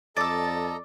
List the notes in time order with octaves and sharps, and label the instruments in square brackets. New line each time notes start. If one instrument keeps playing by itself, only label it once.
[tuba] F2 [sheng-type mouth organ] A4 D#5 A#5 [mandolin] D5 E6 [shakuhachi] A5